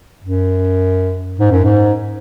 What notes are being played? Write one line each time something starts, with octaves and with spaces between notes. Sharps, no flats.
F#2
G#2
F#2
G#2